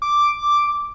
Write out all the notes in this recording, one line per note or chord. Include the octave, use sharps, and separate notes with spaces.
D6